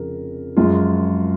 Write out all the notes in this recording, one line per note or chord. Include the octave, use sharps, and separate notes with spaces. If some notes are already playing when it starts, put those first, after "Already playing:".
Already playing: F1 F2 C#3 A#4
F#2 F3 G#3 F4